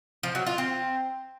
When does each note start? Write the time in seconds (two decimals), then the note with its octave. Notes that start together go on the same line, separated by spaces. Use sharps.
0.23 F3
0.35 F#3
0.46 F4
0.58 C4